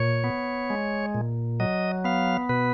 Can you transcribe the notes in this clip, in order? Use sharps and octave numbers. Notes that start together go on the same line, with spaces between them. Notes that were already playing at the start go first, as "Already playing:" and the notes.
Already playing: A#2 C#5
B3
G#3
A#2
F#3 D#5
B3 F5
B2 B4